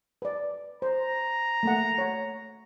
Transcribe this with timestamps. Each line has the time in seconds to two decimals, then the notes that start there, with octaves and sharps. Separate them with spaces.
0.22 B4 D5
0.82 C5 A#5
1.63 A3 A#3 F#5
1.98 C#5 F#5